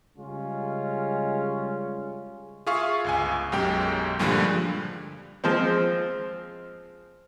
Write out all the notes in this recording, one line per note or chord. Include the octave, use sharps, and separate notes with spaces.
C#3 G3 G#3 C#4 F4
F4 G#4 E5 F5 C#6
G1 C#2 G#5
B1 F#2 G#3 G4 G5
G2 A#2 D3 F3 G3 G#3
F3 G#3 C4